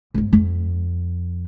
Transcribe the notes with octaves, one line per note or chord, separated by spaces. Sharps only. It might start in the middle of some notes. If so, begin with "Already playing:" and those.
G1 G#2
F2